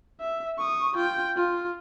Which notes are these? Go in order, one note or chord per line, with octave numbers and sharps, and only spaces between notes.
E5
C#6 D#6
F4 G5
F4